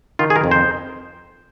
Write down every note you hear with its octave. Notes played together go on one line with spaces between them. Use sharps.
D#3 F4
G#4
A#4
F2
C5